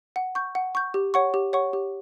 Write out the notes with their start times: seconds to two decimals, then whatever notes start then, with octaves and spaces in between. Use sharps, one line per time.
0.16 F#5
0.35 C#6 G6
0.55 F#5
0.75 C#6 G6
0.94 G4
1.14 C#5 F#5 C#6
1.34 G4
1.53 C#5 F#5 C#6
1.73 G4